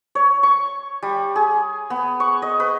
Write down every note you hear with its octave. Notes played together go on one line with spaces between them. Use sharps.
C#5
C#6
G3
G#4
B3
C#6
D#5
B4